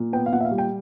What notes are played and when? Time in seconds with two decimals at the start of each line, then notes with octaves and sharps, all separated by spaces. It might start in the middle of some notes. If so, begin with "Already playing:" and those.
Already playing: A#2
0.13 B3 G5
0.26 F5
0.32 A#2 F#5
0.40 E5
0.45 F5
0.51 G3
0.58 G5